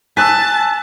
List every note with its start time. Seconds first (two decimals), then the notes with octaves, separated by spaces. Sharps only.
0.17 G#5 A5 E6 F#6 B6